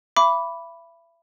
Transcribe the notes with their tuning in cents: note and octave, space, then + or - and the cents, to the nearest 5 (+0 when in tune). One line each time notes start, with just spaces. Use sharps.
E5 +35 B5 +0 D6 -15